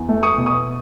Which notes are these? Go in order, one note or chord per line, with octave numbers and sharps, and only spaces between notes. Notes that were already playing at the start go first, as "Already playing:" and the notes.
Already playing: E2
A3
C#6 D#6
B2
C#6 D#6